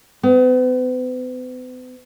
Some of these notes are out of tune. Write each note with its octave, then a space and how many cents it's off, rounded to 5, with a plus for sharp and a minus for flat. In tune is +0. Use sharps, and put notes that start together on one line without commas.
B3 +45